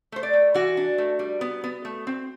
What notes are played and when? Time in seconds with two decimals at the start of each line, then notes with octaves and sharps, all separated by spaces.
0.12 A3 C5
0.23 D5
0.33 A3
0.54 E3 F#4
0.77 D4
0.98 A3
1.19 G3
1.41 B3
1.64 B3
1.85 A3
2.07 C4